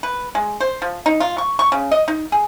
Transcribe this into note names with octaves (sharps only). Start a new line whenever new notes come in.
B4
G#3
C5
F3
D#4
F4
C#6
C#6
C#3
D#5
D#4
G#4